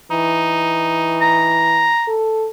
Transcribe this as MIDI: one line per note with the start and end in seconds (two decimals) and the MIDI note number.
0.11 1.94 52
0.11 1.63 63
1.21 2.13 82
2.08 2.48 69